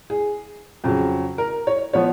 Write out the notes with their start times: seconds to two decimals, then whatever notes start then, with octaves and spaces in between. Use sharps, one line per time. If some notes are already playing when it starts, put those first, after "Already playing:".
0.10 G#4
0.84 F2 C#3 F#3
1.38 A#4
1.67 C#5
1.93 F3 B3 C#5